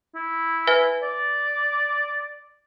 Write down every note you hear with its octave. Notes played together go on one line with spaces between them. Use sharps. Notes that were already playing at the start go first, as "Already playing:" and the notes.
E4
B4 E5 G#5
D5